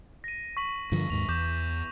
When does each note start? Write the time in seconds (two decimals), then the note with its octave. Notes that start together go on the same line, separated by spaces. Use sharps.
0.24 A#6 D#7
0.57 C#6 B6 F#7
0.92 G2 D3 F3
1.10 D#2 G#2 F7
1.29 E2 D6 G6 E7